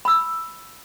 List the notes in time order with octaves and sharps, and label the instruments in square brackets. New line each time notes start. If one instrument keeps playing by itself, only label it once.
[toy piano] B5 E6